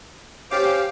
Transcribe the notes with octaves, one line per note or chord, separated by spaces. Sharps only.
C#4 G4 C5 F5 D6